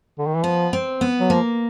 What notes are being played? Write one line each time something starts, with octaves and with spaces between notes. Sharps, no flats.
D3
D#3
E3
F3 B3
C4
B3
F#3
F3 A#3